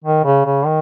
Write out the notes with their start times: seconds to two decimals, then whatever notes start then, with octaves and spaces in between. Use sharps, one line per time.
0.04 D#3
0.25 C#3
0.46 C#3
0.66 D#3